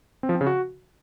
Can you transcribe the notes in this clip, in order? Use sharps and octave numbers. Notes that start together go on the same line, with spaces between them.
C4
F3
C4
C#3
F#4